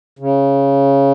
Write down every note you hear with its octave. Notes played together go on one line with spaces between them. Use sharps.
C#3